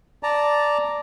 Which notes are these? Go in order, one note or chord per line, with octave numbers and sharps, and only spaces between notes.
D5 A5 A#5